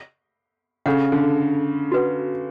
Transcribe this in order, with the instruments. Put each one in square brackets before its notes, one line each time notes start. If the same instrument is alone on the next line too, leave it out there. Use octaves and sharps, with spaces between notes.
[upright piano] C#3 [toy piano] D4 A4 C#5 F#5
[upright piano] D3
[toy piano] F#4 B4 F#5